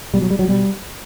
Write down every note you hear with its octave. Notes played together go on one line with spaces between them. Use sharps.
B2 G3
F#3
G3
F#3
B2 G3